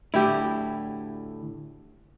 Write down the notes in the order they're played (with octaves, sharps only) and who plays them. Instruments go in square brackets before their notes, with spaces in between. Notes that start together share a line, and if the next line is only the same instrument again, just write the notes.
[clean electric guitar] D2 A2 [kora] E4 G4